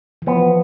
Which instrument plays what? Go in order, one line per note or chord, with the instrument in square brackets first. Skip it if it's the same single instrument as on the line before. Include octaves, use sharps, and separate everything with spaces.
[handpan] E3
[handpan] F3 [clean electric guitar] B3